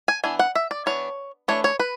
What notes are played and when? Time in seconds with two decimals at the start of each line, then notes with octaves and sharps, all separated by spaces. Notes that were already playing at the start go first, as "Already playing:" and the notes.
0.08 G#5
0.24 E3 B3 D4 G#5
0.39 F#5
0.55 E5
0.71 D5
0.86 E3 B3 D4 C#5
1.48 E3 A3 D4 C#5
1.64 C#5
1.79 B4